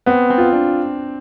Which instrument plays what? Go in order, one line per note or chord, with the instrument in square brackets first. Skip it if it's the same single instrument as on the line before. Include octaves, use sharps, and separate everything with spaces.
[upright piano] B3 [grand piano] C4
[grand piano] C4
[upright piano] F4
[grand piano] D4